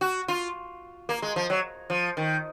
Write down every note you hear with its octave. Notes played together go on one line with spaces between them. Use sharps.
F#4
F4
A#3
G#3
F3
F#3
F3
D#3